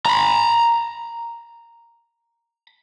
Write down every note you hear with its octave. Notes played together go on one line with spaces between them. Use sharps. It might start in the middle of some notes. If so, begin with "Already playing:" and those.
A#5 B5